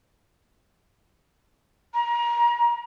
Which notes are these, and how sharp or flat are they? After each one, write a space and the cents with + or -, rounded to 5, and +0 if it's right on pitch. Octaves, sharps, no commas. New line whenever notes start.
A#5 +30